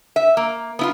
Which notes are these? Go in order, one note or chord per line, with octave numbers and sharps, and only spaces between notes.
E5
A#3
B3 E4 F4